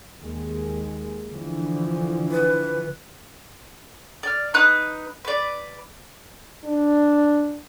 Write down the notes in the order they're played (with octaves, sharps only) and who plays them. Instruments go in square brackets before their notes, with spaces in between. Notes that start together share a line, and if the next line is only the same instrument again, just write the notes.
[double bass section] D#2 G#3
D3 E3 F3
[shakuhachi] B4
[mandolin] D5 F6
D#4 B4 D#6 F#6
B4 D5
[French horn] D4